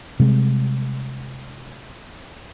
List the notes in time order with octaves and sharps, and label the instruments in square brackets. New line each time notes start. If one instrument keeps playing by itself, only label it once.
[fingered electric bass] C3 G3 G#3